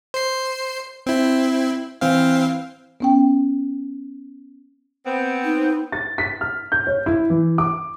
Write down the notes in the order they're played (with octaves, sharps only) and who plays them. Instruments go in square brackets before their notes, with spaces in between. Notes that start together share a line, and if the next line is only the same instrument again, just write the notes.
[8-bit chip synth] C5 C7
C4 E4
E3 C4 F5
[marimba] B3 C#4 G5
[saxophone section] B3 C4
[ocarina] D#4
[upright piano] A6
B6
F6
G6
C#5
E4
E3
D6